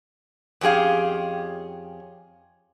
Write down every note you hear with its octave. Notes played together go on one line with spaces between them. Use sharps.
F2 C#4 G4 G#4 F5